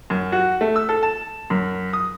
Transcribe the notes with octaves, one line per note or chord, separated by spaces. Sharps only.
F#2
F#4
A3
E6
A4
A5
F#2
D#6